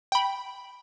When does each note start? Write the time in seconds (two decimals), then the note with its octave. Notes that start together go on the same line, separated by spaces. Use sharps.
0.12 G5 B5